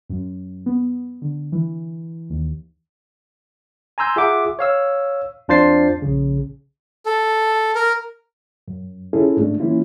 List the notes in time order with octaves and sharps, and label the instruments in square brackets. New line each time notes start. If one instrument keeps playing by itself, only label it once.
[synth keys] F#2
B3
D3
E3
D#2
[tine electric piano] G#5 A#5 C6 E6 G6
F4 G#4 E5 F#5 D6
C#5 F5 E6
F2 D4 F4 C5 A6 C7
A#1 C#3
[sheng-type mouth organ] A4
A#4
[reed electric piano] F#2
C#4 E4 F4 G#4 A4
G#2 A3 D4
E3 A#3 C#4 E4 F4